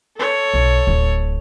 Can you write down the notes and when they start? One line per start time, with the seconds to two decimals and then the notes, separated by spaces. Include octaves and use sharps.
0.16 A4 C#5
0.54 B1
0.87 D1